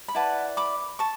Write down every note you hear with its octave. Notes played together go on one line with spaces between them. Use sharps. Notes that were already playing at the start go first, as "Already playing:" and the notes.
B5
E4 B4 D5 F#5 A5
B5 D6
A5 C#6